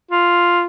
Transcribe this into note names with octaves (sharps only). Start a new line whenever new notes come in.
F4